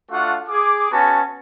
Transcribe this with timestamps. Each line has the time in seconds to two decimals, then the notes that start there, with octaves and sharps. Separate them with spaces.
0.11 A3 D4 F4 F#4 F5 F#5
0.48 G#4 D6
0.92 B3 C#4 F#4 G#5 A5